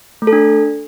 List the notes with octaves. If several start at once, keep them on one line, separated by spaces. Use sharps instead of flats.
A3
A4
D4